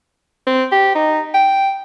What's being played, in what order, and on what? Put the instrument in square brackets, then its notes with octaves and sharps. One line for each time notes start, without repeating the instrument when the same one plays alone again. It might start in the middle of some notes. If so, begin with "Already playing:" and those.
[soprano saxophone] C4
G4
D#4
G5